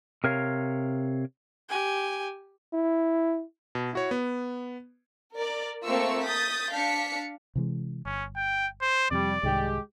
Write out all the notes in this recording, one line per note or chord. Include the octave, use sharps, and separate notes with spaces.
C3 A#4 C#5 F5
G4 G#5
E4
B2
E4 F#4 C#5
B3
A#4 D5
A3 A#3 C4 F4 C#6 E6
D#6 G6 A6 B6
D4 F5 B6 C#7
C3 E3 G#3
G1 C#4
G5
C5
F2 C3 G3 D5
C2 G#2 D#3 G#3 G4